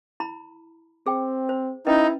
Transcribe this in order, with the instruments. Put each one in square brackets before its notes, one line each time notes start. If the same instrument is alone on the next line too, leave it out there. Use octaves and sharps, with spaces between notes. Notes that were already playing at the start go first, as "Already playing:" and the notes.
[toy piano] E4 A#5 B5
[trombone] C4 [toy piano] G#4 G5
[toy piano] C5
[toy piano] C#4 B4 D#5 [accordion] D#4 [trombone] E4